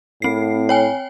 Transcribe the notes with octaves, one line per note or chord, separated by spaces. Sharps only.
A2 C4 C7
C#5 G5 G#5